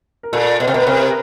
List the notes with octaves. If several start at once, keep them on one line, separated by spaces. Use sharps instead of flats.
A#4
A#2 A4
B2
C3
B2 A#4
B4
C3 A#4